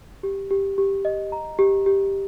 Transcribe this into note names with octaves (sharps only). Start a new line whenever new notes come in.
G4
G4
G4
D#5
A#5
G4
G4